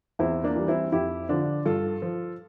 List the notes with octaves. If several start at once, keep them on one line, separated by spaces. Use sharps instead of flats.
E2 C4 E4
A#3 D4
E3 G3
C4 E4
F2 E4 G4
D3 F3 D4 F4
G2 F4 A4
F3